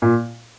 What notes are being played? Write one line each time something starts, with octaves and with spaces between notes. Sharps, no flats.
A#2